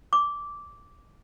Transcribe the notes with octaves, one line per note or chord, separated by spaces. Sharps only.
D6